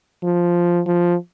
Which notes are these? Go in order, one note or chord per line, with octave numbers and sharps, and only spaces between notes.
F3
F3